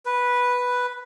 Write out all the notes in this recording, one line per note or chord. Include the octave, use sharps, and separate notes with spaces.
B4